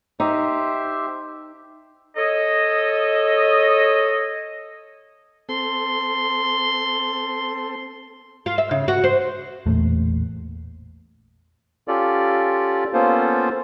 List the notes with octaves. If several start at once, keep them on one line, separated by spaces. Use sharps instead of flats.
D#4 G4 C5 E5
A4 C#5 D#5
C4 A4 C6
F4
E5
C#3
F#4
C5
A1 E2 A#2 A3
C#4 F4 G4 A4 D5
A#3 B3 C#4 F4 A4 C5